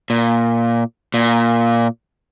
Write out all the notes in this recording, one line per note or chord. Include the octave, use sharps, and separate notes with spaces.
A#2
A#2